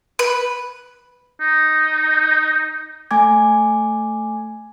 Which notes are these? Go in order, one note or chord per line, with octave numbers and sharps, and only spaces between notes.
B4
D#4
A3 G#5 D6 G#6